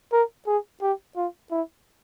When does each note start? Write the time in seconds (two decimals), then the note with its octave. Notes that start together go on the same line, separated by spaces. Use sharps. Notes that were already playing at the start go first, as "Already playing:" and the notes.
0.12 A#4
0.47 G#4
0.82 G4
1.16 F4
1.51 E4